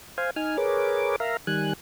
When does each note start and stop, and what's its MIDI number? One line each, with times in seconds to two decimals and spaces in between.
0.18 0.30 72
0.18 0.30 77
0.18 0.30 80
0.36 0.57 63
0.36 0.57 80
0.36 0.57 89
0.57 1.16 68
0.57 1.16 70
0.57 1.16 71
0.57 1.16 73
0.57 1.16 86
1.20 1.37 70
1.20 1.37 76
1.20 1.37 77
1.20 1.37 82
1.47 1.73 51
1.47 1.73 55
1.47 1.73 80
1.47 1.73 90